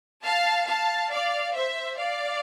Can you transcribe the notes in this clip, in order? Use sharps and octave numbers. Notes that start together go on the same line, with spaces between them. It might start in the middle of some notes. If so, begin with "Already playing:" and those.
F5 A5
F5 A5
D5 F5
C5 E5
D5 F5